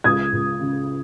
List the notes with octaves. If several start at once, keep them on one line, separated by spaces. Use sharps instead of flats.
C#2 D#6 G#6
C#2
C#3